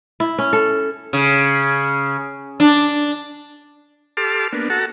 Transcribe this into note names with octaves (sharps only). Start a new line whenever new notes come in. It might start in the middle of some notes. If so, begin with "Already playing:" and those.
E4
C#4
A4
C#3
D4
G4 A4 A5 C6 D6 F6
A#3 B3 D4
F#4 A4 F#5 A5 A#5